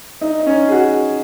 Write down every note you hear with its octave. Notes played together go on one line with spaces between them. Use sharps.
D#4
D#4
C#4
G#4
F#4